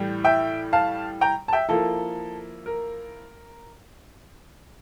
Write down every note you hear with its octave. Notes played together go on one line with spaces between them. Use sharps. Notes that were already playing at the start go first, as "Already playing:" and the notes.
Already playing: A2 E3 G3
E5 G5
F5 A5
G5 A#5
A5
E5 G5
F3 A#3 E4 A4
A#4